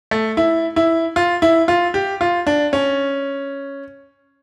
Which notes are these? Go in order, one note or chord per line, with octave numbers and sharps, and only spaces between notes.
A3
E4
E4
F4
E4
F4
G4
F4
D4
C#4